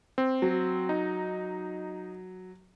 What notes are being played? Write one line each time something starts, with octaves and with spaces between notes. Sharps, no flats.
C4
F#3
D#4